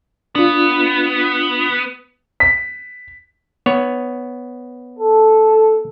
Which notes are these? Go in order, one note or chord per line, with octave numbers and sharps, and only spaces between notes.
B3 D4 F4
B6
B3 C#5
A4